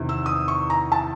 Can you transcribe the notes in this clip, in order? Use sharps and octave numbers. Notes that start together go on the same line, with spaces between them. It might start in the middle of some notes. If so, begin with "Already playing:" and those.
Already playing: E2 C3 D#3
E6
D#6
C#6
A#5
A5